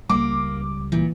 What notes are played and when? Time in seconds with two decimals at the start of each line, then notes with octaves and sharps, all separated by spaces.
0.09 C#2 G3 A#3 D6
0.92 A#2 E3